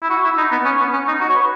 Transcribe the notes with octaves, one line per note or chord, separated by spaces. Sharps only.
E4
F#4
E4
D#4
B3
C#4
B3
C#4
D#4
F#4
C#5
B4